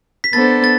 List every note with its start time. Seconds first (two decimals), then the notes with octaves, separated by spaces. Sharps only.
0.24 B6
0.33 B3 D4 A4 C5 A6
0.64 A6